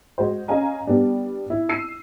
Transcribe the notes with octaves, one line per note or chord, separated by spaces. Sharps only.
G#3 F#4 C5
C#4 D#5 F5 G#5 A#5
G3 B3 D4
E4
E6 C7 D#7